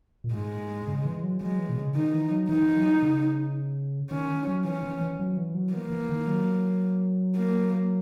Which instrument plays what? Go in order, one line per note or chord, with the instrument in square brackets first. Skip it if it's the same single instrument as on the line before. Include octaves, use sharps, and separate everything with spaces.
[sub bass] A#2
[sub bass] G#2 [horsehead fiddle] G#3
[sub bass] C#3
E3
F#3
[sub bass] F#3 [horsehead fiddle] G#3
[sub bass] E3
B2
C#3
[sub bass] D#3 [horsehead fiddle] D#4
[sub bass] E3
F#3
[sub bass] E3 [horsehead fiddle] D#4
[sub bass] E3
F#3
C#3
[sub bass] D#3 [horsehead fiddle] C#4
[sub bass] F#3
[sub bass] E3 [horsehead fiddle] C#4
[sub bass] E3
E3
F#3
E3
F#3
[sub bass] E3 [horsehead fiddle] A#3
[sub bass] E3
D#3
F#3
[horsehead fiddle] A#3